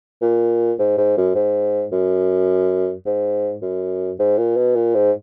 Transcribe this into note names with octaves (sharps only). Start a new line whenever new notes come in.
A#2
G#2
G#2
F#2
G#2
F#2
G#2
F#2
G#2
A#2
B2
A#2
G#2